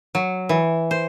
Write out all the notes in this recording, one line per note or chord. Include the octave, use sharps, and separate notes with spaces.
F#3
E3
C5